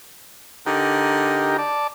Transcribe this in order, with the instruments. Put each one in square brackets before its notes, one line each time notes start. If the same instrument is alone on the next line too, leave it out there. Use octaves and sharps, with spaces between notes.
[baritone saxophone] D3 [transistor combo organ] D#4 G4 A#4
[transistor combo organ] D5 A5